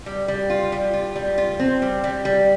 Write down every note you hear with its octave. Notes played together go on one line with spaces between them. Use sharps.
G3
G3
F4
G3
F4
G3
F4
C4
G3
G3
G3